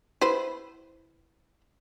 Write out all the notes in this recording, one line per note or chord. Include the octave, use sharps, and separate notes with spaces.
E4 B4 C5